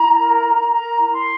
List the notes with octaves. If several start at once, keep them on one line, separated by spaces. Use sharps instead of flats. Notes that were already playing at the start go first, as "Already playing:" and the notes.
Already playing: E4 A#5
A#4
A#4
A#4 A#5
E4 A#5
C6